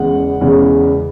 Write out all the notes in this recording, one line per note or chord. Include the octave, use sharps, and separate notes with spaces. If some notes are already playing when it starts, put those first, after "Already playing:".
Already playing: E2 C#3 G#3 F#5
E2 C#3 G#3